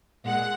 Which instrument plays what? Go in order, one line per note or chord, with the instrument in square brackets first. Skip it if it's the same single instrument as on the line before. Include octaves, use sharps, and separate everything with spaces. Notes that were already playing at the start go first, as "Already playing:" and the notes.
[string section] A#2 G#3 F#5